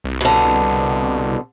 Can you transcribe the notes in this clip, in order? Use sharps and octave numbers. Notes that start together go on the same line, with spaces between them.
C2
B2 D3